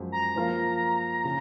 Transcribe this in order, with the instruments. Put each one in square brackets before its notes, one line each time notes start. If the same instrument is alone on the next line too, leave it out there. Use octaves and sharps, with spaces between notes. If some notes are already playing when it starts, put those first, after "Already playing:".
Already playing: [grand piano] F#2 F3 G#3
[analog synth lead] A#5
[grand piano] F3 A#3 F4 A#4 F5
C#3